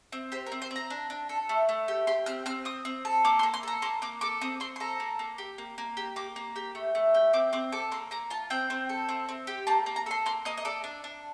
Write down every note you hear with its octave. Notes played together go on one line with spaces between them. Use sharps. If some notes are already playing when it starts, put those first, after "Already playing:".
C4
G4 C5
A#4
C4
C5
C4 A#5
D4
D4
A4
A3
A3
G4
G4 C6
C4 F6
C4 F6
C4 D#6
C4
A4
A#3 D6
C6
A#3
C6
A4 A#5
A#3 C6
A#3 D6
A4 D6
C4 D#6
C4 C6
C6
A4 A#5
A#3
A#3
G4
A#3
A#3
G4
A#3 D6
A#3
G4
A3
A3
G4
C4 D6
C4 D6
A4 D6
A#3 C6
A#3 A#5
F4 A5
C4 G5
C4
A4
C4
C4
G4
A#3 A5
A#3
A#5
A4 C6
A#3 C6
A#3 D#5
D#5
A4 D5
D4
D4